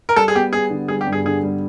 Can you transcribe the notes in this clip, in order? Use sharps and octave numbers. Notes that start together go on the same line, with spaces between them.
A#4
G3 A4
G#4
B3 G4
B3 G#4
D3
G3 G#4
G4
G2
G#4
D3 G#4
G3